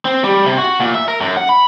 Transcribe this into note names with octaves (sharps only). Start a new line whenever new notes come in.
C4
G3
C3
F#4
A#2
E5
A#4
F#2
F#5
B5